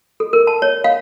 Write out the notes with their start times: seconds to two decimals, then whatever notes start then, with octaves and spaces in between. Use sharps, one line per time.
0.20 A4
0.33 A#4
0.47 A5
0.62 C#5
0.84 F5